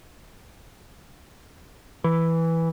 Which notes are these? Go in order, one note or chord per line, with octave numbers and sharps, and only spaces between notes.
E3